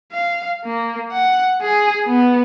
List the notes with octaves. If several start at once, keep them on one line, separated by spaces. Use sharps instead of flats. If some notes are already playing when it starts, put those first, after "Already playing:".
F5
A#3
F#5
G#4
B3